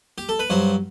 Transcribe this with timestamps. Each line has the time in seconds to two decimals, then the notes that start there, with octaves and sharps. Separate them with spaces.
0.18 G4
0.29 A4
0.39 B4
0.50 G2 F#3 C5